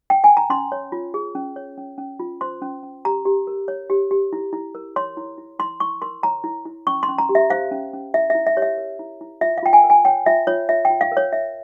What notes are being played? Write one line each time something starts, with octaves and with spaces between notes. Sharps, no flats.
G5
G#5
A#5
C#4 C6
C#5
F4
G#4
C#4
C#5
C#4
C#4
F4
C5 C6
C#4
C#4
G4 A#5
G4
A#4
C#5
G4
G4
E4
E4
A#4
C#5 C6
E4
E4
E4 C6
E4 C#6
A#4 C6
C#5 A#5
E4
E4
C#4 C#6
C6
C#4
A#5
G4
E5
C5 F5
C#4
C#4
E4 E5
E5
E4
E5
G4 C#5
E5
A#4
E4
E4
F4 E5
F5
F4 G5
G#5
A#4
G#5
C#5 G5
F4 E5
F4 C#5
F4 E5
G5
F4
F5
A#4
C#5
C#5 E5